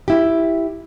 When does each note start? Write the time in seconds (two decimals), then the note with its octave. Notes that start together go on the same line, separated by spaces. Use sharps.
0.08 E4 G4